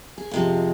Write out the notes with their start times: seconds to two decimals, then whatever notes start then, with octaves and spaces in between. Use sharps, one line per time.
0.18 G#4
0.31 F2 C3 F3 G#3